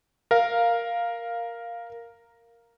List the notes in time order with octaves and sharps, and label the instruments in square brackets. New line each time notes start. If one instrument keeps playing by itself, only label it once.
[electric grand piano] A#4 F5